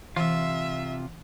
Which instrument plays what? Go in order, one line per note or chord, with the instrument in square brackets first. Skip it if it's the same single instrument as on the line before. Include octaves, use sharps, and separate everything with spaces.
[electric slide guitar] C3 F4 [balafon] E3 [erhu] E5